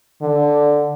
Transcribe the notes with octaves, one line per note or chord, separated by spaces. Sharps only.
D3